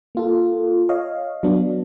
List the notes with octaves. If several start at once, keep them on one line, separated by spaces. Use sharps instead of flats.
A#3 F4 A4
C#5 D#5 F5
F#3 B3 D4